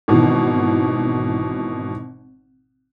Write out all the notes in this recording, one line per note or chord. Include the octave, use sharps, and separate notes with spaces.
G#1 B2 D#3 E3